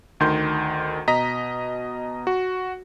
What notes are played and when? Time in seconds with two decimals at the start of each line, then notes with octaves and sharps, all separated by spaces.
0.20 D2 D#3 C6 G6
1.08 B2 D#5 A#5 B6
2.27 F#4